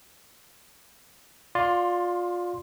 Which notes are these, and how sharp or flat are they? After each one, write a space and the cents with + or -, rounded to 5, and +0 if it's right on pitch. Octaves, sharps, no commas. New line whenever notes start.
F4 +20 D5 +0 C6 +0